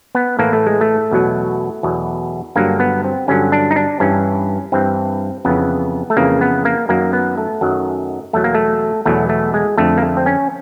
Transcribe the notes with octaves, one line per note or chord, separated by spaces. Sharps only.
B3
A2 E3 A#3
A3
G#3
A3
E2 B2 F#3
E2 B2 F#3
G2 D3 F#3 A#3
B3
C4
G2 D3 F#3 C#4
D4
D#4
D4
G2 E3 C#4
G2 E3 C4
F2 C#3 E3 B3
A3
F2 C#3 E3 A#3
B3
A#3
F#2 D#3 F#3 A#3
B3
A3
F#2 D#3 F#3
E2 B2 F#3 A3
A#3
A3
E2 B2 F#3 A3
A3
G#3
F2 D3 F3 A3
A#3
A3
C4
C#4